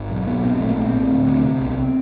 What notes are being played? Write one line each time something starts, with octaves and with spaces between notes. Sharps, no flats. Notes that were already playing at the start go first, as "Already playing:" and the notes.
Already playing: G#1
B1
B1 B3
B2 C4
A#1 A3
A#3
A#1 A3
C4
A2
D2
D2
C3
B1